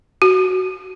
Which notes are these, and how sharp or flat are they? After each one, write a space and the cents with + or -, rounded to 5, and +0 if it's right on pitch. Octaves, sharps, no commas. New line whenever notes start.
F#4 +10